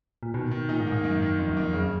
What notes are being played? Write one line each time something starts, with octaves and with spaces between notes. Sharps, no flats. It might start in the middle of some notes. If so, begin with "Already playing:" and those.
A#2
B2 D#3
D#3
A#2 D#4
G#2
A#3
G#2
F#2 D#3
D#3
F2 D#4
F#2
F2 A#3
F#2 C#3